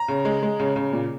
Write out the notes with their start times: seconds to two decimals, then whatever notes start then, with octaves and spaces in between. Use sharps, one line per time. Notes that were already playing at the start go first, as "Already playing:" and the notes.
Already playing: A#5
0.08 C#3
0.25 G#3
0.43 G#3
0.60 C#3
0.76 C#3
0.92 A#2